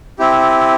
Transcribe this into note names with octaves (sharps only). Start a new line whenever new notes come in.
C4 E4 G4